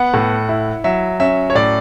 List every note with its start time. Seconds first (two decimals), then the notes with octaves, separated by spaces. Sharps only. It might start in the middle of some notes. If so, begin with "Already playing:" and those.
Already playing: B3 F#5
0.14 A2
0.49 E4
0.84 F#3 E5
1.20 C#4 E5
1.50 C#5
1.55 A2 D5